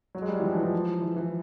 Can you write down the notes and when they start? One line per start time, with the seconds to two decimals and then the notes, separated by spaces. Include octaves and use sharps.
0.15 F#3
0.22 G#3
0.29 G3
0.39 E3
0.43 F3
0.53 E3
0.63 F3
1.01 E3
1.16 E3